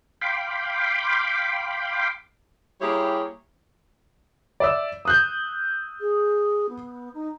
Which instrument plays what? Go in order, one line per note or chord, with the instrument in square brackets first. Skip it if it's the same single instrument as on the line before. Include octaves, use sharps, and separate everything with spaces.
[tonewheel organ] F5 G5 B5 C6 D6
[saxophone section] G3 A#3 E4 G4 G#4 C#5
[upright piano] D5 E5 E6
D#6 F#6 G6
[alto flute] G#4
B3
D#4